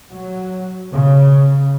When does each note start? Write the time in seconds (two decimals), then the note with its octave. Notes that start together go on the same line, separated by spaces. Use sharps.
0.11 F#3
0.93 C#3